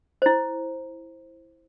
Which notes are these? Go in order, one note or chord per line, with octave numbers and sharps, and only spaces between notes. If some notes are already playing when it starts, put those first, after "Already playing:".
E4 C5